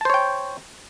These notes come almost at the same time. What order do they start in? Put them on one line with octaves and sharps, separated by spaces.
A5 C5 C#5 G5